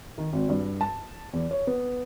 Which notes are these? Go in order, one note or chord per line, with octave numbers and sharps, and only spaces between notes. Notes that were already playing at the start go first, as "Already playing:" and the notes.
D#3
G#1
G2
A5
E2
C#5
B3